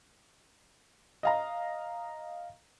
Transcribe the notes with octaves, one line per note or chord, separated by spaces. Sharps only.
D#5 F5 A#5